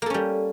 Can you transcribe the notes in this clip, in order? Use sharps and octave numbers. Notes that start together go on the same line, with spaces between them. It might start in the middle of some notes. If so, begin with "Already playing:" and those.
G3 A#3 C#4 A4